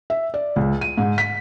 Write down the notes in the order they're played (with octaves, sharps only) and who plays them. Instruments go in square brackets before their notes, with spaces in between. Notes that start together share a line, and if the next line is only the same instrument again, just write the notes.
[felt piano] E5
D5
C#2
D#7
G#2
B6